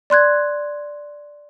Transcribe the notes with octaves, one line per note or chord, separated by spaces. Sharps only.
D5 C6 F#6 G#6